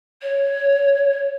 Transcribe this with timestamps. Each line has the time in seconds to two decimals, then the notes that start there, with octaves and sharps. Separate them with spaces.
0.22 C#5